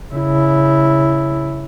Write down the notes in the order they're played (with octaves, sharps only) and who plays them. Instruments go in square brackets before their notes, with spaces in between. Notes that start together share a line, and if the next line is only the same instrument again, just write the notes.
[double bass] C#3 E4